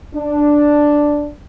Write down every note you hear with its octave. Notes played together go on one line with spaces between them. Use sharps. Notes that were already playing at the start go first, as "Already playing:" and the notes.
D4